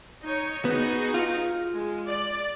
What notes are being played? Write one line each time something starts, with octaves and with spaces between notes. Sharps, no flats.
D#4 C#5
B3 D#4 F#4 G#4
F4
G#3
D5